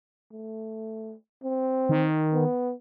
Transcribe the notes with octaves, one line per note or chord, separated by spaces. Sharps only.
A3
C4
D#3
B3